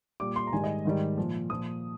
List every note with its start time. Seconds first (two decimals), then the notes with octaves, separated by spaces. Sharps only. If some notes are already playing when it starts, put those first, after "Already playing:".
0.20 A#2 G3 D6
0.36 C6
0.47 A#5
0.52 G#2 D#3 G3 G#5
0.64 D#5
0.85 G#2 D#3 G3
1.18 A#2 F3
1.50 A#2 F3 D#6